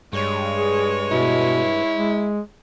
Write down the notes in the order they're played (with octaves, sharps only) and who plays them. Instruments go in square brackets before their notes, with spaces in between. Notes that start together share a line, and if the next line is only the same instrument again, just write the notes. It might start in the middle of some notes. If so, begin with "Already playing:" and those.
[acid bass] G2 [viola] G#3 C#5
[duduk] G#4
[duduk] B2 [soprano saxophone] E4
[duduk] G#3